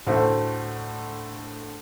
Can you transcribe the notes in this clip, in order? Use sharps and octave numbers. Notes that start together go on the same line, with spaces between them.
D2 A2 A3 F#4 C5